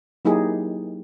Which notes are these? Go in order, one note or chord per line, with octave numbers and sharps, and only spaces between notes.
F#3 A#3 D#4 E4 G4 G#4